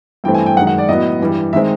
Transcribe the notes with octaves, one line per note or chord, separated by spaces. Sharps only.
G2 E3 A3 C4 G5
G#5
G5
F#2 D#3 G#3 F#5
F#5
D5
A2 F#3 B3 D#5
G2 E3 G3
D#3 G#3 C4 E5